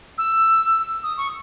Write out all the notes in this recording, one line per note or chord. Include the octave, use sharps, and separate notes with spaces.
E6
D#6
C#6